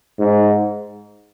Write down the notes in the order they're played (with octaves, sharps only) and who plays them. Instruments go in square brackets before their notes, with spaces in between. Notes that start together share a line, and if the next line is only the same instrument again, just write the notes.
[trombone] G#2